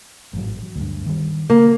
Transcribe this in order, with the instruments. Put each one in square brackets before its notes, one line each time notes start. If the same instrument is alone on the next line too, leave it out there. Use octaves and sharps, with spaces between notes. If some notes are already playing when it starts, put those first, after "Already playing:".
[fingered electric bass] A1 G#2 F#3
D2 G2
D#3 G3
[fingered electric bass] C#3 [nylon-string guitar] A#3